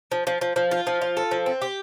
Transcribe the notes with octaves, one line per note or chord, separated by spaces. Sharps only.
F3
F3
F3
F3
F4
F3
F4
A4
F3
C4
G4